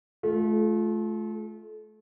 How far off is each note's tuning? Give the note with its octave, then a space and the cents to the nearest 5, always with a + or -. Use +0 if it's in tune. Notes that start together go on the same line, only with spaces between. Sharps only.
A3 -35 F4 +0